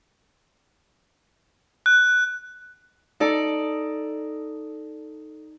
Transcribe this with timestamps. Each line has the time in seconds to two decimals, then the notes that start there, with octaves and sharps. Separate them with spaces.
1.86 F#6
3.20 D#4 A4 D5